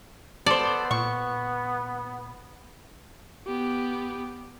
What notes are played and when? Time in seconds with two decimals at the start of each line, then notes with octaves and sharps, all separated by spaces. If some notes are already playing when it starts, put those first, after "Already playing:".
0.46 B3 A4 C5 D5
0.91 A#2 C#6
3.47 B3 G4